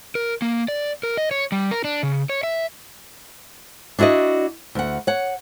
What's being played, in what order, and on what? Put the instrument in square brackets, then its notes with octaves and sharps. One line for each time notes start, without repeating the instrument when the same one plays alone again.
[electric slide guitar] A#4
A#3
D5
A#4
D#5
C#5
G3
A#4
D4
C#3
C#5
E5
[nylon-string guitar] D4 E4 F#4 D5 D#5
D2 F#5
C#5 F#5